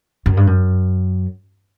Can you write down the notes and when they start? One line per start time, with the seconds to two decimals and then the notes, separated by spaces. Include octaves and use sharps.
0.26 F#2
0.37 G2
0.47 F#2